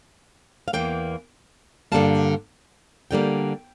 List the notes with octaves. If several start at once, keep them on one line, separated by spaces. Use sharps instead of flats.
F5
E2 E3 A#3 G5
G2 D3 G3 A#3 A5
D3 G3 A#3 G5